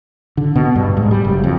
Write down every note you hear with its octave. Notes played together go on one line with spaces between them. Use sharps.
D3
B2
G2
G#2
G3
F#1
F2